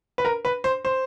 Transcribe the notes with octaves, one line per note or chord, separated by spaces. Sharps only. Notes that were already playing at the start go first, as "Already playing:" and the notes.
B4
A#4
B4
C5
C5